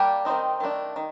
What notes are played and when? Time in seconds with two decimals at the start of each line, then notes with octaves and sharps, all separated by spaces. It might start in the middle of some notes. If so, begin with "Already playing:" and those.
Already playing: G3 A#3 D4 G4
0.25 D#3 F#3 C4 D#4
0.60 D#3 A3 D4
0.96 D#3